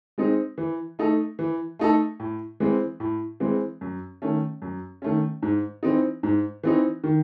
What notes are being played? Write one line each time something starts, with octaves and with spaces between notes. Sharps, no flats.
G#3 C4 D#4
E3
A3 D#4 A4
E3
A3 D#4 A4
A2
E3 G#3 C4
A2
E3 G#3 C4
F#2
D#3 A3 C#4
F#2
D#3 A3 C#4
G#2
E3 C4 D#4
G#2
E3 C4 D#4
D#3